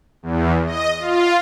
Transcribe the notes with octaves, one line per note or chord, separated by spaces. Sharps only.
E2
D#5
F4